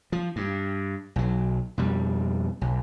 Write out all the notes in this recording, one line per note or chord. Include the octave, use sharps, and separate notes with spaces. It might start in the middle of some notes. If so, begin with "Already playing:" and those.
F3
G2
B1 F#3
F2 B2 G3
B1